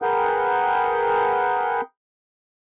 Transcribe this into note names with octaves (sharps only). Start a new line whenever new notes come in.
G#4 A#4 B4 F#5 G5